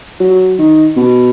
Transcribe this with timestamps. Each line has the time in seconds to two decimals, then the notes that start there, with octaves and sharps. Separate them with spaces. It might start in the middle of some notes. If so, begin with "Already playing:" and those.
0.20 F#3
0.59 D#3
0.97 B2